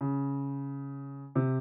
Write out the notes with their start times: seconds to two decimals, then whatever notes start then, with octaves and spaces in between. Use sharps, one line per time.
0.01 C#3
1.35 C3